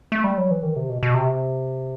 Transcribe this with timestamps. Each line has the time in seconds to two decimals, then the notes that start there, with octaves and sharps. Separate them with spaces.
0.12 A3
0.24 G3
0.38 F#3
0.51 E3
0.63 D#3
0.76 C3
0.89 B2
1.03 B2
1.14 C3